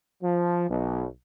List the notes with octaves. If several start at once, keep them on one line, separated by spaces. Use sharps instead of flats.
F3
B1